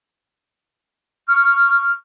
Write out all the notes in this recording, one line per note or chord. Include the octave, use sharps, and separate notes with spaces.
C#6 F6